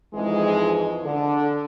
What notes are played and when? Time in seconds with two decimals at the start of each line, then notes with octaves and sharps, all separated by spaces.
0.13 F2 G#2 E3 G#3
1.03 D3